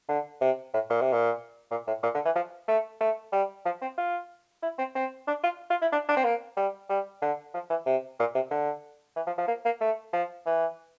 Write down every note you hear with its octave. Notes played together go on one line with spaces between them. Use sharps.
D3
C3
A2
A#2
C3
A#2
A#2
A2
A#2
D3
E3
F3
A3
A3
G3
F3
C4
F4
E4
C4
C4
D4
F4
F4
E4
D4
D4
C4
A#3
G3
G3
D3
F3
E3
C3
A#2
C3
D3
E3
F3
F3
A#3
A#3
A3
F3
E3